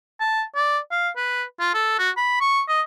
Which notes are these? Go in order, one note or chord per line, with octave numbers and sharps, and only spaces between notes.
A5
D5
F5
B4
F4
A4
F#4
B5
C#6
D#5